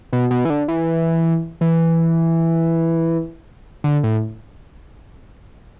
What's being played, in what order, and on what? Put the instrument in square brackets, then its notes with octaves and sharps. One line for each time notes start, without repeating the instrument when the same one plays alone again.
[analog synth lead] B2
B2
E3
D3
E3
E3
D3
A2